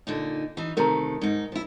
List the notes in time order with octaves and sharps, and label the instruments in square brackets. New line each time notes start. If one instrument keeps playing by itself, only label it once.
[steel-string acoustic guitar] A#2 D3 D#4
E3 D#4
[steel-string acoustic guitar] C3 D#3 A3 [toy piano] A#4 A#5
[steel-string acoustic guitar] G#2 D#4
F3 E4